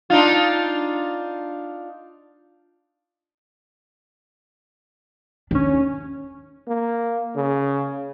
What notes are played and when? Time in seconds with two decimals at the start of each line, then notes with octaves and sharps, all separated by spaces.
0.10 D4 D#4 F4
5.51 D#2 C#4 D4
6.68 A#3
7.35 C#3